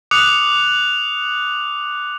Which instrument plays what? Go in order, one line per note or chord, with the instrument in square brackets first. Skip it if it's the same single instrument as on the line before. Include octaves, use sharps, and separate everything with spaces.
[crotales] D6 D#6 F#6 C#7 F7